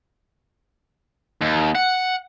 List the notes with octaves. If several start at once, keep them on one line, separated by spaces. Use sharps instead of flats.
D#2
F#5